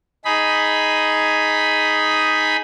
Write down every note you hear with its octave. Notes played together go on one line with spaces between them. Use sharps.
D#4 G#4 B5